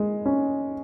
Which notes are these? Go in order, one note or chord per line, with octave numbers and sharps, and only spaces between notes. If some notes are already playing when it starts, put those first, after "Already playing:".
Already playing: G#3
C#4